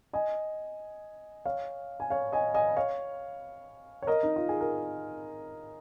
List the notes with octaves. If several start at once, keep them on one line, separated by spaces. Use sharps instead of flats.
D#5 G#5
C#5 F5
G#5
C#5 F5
D#5 G#5
D#5 G#5
C#5 F5
C#5
A#4 D#5
D#4
F4
G#4
A#4